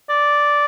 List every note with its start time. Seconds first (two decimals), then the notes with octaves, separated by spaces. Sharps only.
0.10 D5